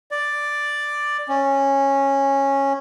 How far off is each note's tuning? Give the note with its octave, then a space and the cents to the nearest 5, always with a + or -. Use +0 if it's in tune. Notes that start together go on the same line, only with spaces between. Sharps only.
D5 +5
C#4 -10